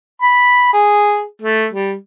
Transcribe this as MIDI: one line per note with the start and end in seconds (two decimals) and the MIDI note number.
0.22 0.72 83
0.73 1.22 68
1.42 1.67 57
1.73 1.94 55